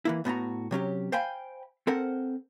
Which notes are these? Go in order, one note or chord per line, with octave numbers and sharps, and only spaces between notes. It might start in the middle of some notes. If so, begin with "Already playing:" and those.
E3 A#3 E4
A2 B3 F#4 A#5
C3 F#3 C#4 G4
C5 F5 G5 G#5 B5
C4 A4 A#4 C5 F#5